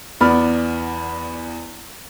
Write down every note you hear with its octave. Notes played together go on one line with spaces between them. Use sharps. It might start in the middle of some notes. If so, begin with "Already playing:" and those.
E2 B3 D5 B5 F6